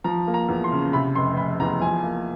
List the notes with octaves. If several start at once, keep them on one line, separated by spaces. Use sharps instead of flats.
F3 A#5
A#3
A#5
E2
C6
C#3
C3 B5
F1 C6
F1 B5
E2 A#5
F3 G#5
A#3